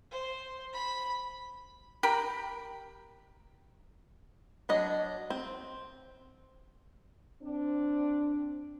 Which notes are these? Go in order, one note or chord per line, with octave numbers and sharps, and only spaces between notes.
C5
B5
G4 A#4 B5
F#3 D4 D#5
C4
C4 D4